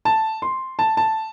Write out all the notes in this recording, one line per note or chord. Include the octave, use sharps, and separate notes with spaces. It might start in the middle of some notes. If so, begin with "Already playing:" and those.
A5
C6
A5
A5